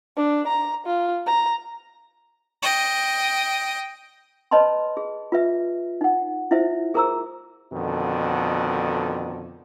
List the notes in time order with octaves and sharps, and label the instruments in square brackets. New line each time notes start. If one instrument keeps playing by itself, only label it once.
[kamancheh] D4
A#5
F4
A#5
[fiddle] D#5 G5
[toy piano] B4 C#5 D#5 A5 B5 C6
G#4
F4 B4 E5
D#4 F#5
E4 F4 C5 E5
G#4 A#4 C5 A#5 D6 E6
[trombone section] F2 B2 D3 D#3